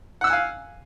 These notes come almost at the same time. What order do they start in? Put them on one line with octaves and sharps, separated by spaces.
F#5 E6 F#6 G#5 F5